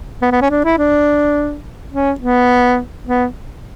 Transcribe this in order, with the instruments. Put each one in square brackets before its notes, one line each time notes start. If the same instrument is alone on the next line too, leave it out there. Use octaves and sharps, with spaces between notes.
[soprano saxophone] B3
B3
C#4
D4
E4
D4
C#4
B3
B3